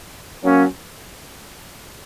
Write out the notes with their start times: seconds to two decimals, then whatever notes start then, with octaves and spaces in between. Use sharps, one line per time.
0.42 F#3 A#3 C#4